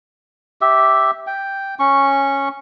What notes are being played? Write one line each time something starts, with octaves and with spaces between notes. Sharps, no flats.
G4 E5
G5
C#4 C#6